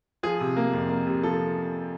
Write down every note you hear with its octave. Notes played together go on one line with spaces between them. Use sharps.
F3 G#4
C3
A#3
F2
A#3
C3
F3 A4